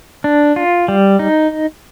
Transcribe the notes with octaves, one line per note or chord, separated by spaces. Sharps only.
D4
F4
G3
D#4